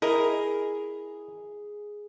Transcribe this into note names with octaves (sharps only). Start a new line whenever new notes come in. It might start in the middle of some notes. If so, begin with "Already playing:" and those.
E4 G#4 A#4 D#5